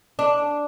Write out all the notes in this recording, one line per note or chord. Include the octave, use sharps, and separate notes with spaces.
D4